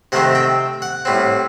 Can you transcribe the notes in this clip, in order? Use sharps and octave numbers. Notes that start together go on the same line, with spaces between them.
C3 D#3 A3 C4 F#5
G5
F#5
A2 G3 C4